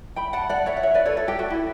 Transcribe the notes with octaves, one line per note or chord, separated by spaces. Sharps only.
G5 B5
F#5 A5
D5 F#5
C#5 E5
F#5
C#5 E5
B4 D5
A4 C#5
A4
G4
F#4
E4